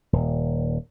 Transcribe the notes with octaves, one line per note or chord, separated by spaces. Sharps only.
D#1